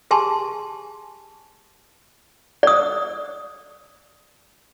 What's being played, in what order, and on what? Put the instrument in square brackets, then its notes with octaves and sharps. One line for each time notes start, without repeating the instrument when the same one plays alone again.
[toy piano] G4 G#4 G#5 A5 C6
D5 D#6